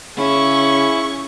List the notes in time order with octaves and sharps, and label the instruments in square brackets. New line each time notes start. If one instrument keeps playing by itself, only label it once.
[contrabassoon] C#3 [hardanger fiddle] C#4 [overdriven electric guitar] E4 [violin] G#4 C#6